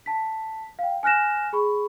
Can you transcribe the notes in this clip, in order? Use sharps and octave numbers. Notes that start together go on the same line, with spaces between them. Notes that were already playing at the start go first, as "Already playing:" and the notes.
A5 B6
F5 G5
G#5 F6 F#6 A#6 E7
G#4 B5 C#6